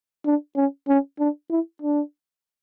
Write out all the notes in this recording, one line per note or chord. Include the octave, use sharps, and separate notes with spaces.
D4
C#4
C#4
D4
E4
D4